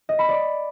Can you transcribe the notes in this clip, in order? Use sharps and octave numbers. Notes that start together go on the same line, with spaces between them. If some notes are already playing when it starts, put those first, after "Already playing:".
D#5
B5
D5